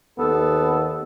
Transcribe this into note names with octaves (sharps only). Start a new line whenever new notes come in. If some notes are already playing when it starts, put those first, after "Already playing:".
D#2 B3 A4